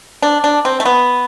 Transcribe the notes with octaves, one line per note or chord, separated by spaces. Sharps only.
D4
D4
C4
A3
B3